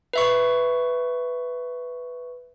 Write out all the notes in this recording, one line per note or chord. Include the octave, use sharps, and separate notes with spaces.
B4 E5 C#6